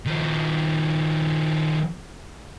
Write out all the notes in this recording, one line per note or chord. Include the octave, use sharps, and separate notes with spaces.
D#3 F3